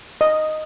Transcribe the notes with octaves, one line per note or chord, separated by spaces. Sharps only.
D#5